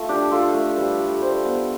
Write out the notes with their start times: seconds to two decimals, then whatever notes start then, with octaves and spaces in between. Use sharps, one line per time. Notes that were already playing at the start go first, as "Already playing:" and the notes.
Already playing: A3 F4
0.09 D4 G4
0.31 F4 A4
0.54 A3
0.77 G3 B4
1.00 G3
1.22 G3 C5
1.45 B3